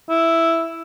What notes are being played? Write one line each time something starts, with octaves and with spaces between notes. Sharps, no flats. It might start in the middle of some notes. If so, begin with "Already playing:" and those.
E4